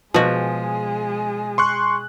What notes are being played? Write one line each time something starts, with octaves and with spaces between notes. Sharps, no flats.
B2 F3 G#3 F#4 G#4
C6 C#6 F#6